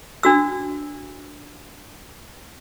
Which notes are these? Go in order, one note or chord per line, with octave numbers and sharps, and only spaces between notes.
D4 F#4 E6